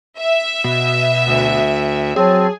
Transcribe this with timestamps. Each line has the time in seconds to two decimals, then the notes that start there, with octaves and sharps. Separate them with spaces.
0.19 E5
0.64 B2
1.25 D2
2.16 F#3 C4 G#4 C#5 A5